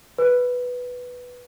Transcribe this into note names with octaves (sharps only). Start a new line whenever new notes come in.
B4